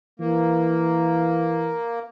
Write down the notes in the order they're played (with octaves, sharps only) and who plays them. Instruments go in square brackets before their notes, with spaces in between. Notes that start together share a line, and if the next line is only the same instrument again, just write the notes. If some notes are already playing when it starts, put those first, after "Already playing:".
[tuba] E3 [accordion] A#3